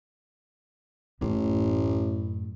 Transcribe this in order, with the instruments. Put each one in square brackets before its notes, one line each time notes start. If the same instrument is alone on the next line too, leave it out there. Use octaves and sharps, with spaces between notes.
[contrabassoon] A1 [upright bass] F#2 A2